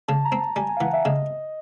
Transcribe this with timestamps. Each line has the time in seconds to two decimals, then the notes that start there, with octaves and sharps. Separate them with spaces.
0.08 C#3 A5
0.25 A#5
0.32 C4
0.41 A5
0.56 G3 G#5
0.69 G#5
0.77 F5
0.81 E3 F#5
0.93 E5
1.05 C#3 D#5